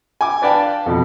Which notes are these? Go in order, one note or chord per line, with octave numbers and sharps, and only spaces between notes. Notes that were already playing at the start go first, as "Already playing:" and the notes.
G#5 D6
D4 B4 D5 F5 G5 A5
F2 B2